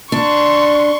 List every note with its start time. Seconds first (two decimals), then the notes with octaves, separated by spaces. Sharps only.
0.12 D4 C6 C#6